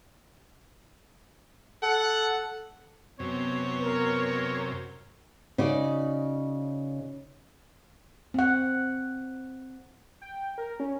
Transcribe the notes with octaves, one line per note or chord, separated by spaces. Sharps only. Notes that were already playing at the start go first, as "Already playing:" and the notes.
A4 F#5
F#2 C3 B3 C#5
A#4
C#3 D#4 F#4 D5
C4 F#5
G5
A#4
C#4